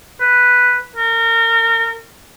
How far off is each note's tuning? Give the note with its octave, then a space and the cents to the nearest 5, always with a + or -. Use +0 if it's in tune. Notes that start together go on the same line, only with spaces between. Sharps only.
B4 +0
A#4 -30